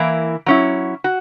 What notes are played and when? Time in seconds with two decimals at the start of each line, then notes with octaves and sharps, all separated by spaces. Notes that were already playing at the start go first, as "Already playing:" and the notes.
Already playing: E3 A#3 E4
0.46 F#3 C#4 E4
1.04 F#4